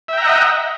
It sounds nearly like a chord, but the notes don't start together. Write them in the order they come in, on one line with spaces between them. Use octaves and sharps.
E5 G5 A#5 F#5 D#5